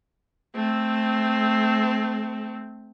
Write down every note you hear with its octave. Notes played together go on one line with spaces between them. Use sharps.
A3 C4